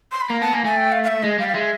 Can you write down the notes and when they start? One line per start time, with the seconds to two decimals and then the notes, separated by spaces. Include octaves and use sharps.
0.12 C6
0.21 B5
0.30 A#3 A#5
0.41 B3 A5
0.53 A#3 G#5
0.64 A3 G#5
0.77 G5
0.92 F5
1.03 F5
1.08 E5
1.23 G#3 D#5
1.38 G3 F5
1.48 F5
1.54 G#3 E5